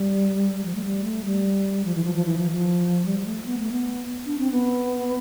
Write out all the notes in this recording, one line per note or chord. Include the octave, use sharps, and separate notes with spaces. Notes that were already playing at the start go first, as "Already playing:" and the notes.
Already playing: G3
F3
A3
G3
A3
G3
F3
E3
F3
F3
E3
F3
F3
G3
G3
A3
B3
A3
B3
D4
C4
B3